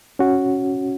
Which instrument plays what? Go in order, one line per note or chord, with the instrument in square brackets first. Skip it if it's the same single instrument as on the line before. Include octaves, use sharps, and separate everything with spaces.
[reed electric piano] C#4 F#4